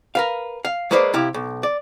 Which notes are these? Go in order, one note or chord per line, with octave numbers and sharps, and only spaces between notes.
A#4 B4 F5
F5
F#3 G#3 A#3 B4 C5 D5
C3 E4 G4 F5
B1
D5